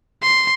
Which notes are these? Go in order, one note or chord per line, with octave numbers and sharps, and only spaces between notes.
C6